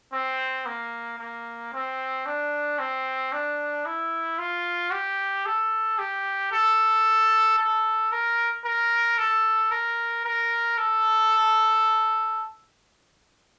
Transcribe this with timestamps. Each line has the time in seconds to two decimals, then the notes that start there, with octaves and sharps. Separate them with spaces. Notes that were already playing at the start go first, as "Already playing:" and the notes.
0.13 C4
0.66 A#3
1.19 A#3
1.73 C4
2.26 D4
2.79 C4
3.33 D4
3.86 E4
4.39 F4
4.92 G4
5.46 A4
5.99 G4
6.52 A4
7.59 A4
8.12 A#4
8.65 A#4
9.18 A4
9.71 A#4
10.25 A#4
10.78 A4